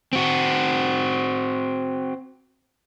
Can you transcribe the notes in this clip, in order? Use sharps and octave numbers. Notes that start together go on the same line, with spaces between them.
C4 F#4